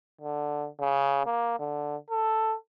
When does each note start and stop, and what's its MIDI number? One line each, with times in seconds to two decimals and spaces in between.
0.21 0.67 50
0.80 1.22 49
1.26 1.57 58
1.59 1.96 50
2.11 2.55 69